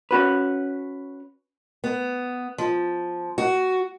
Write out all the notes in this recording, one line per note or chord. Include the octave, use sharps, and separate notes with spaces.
C#4 F#4 B4
B3
F3
F#4